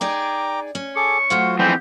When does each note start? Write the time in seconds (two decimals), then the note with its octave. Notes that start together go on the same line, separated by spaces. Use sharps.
0.01 D#4 G#4 D5 G5 A#5 D6
0.75 C#4
0.96 G#4 A4 C#6 D6
1.30 F#3 A3 F4 F#4 C5 F5
1.59 F2 E3 C4 G4 G#4 E5 F#5